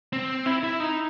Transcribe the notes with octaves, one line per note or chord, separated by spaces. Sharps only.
C4
E4
E4
D#4